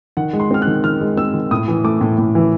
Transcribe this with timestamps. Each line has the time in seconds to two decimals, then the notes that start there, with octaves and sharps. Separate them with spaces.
0.17 D#3 F#5
0.33 G#3
0.40 C6
0.51 C4 F6
0.62 F#6
0.67 D#3
0.84 D#3 F6
1.01 G#3
1.17 C4 E6
1.34 D#3
1.51 A2 D#6
1.68 E3
1.84 A3 D6
2.01 A2
2.19 A2
2.35 E3